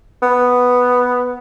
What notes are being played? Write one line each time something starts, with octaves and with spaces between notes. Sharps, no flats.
B3